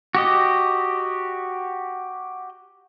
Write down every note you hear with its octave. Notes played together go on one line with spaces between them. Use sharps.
F#4 G4 D#5